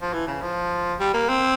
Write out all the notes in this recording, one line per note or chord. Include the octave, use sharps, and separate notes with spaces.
F3
E3
C#3
F3
G3
A#3
C4